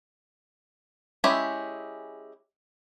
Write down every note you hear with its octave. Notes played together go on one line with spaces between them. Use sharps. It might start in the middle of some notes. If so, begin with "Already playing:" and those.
G#3 C#4 E4 G4 E5